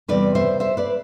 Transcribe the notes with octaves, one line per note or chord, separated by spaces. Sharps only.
E2 C3 G3 B4 D5
C5 E5
C5 E5
B4 D5